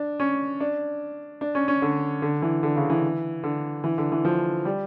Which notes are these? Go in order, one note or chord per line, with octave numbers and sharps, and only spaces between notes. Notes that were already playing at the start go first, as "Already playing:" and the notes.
Already playing: D4
C#4
D4
D4
C#4
C#4
D3
D3
E3
D3
C#3
E3
D3
E3
D3
E3
F3
G3